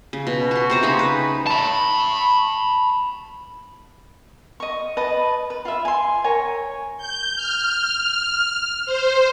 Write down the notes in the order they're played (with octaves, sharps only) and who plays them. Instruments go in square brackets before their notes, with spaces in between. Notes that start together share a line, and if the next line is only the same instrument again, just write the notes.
[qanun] C#3
B2
F#4 C6
C3 C5 A#5
C#3 D#4 C#5 B5
B4
[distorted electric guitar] A5 B5
[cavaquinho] D#5 C#6
B4 D#5 A5
B4
F4 E5
G#5 C6
A#4 C#5 G#5
[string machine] G6
F6
C5